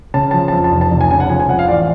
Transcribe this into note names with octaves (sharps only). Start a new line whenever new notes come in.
C#3 A5
F3 A5
A5
F2
A5
F1
A5
F1
G#5
C#3 G#5
F#5
F3 G#5
G#5
F2 F#5
F5
A1 D5